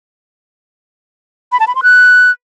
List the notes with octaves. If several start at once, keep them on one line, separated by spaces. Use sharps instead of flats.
B5
A5
B5
C6
F#6